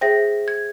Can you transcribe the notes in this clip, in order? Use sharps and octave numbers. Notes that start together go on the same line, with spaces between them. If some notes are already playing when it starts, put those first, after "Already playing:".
G#4 C5 E5 G5 A#6
G#6